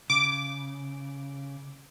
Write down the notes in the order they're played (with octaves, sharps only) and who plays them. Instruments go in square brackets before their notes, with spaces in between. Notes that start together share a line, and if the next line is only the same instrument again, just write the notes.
[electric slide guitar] C#3 [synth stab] D6